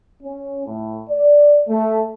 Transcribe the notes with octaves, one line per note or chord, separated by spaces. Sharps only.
C#4
A2
D5
A3